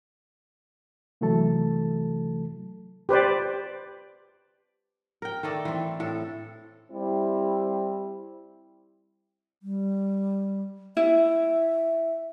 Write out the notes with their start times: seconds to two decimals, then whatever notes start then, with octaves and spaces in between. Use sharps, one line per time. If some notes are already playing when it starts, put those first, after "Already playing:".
1.21 C3 E3 F#3 A3 A4 A5
3.09 G4 B4 C5 D5
5.22 A#4 G5
5.43 D#3 A3 A4 D5
5.65 E3 C4
6.00 A2 A4
6.92 G3 C4 E4
9.63 G3
10.97 E4 E5